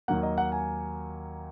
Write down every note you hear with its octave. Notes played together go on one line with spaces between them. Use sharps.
D#2 D#3 F#3 A#3 F#5
D#5
F#5
G#5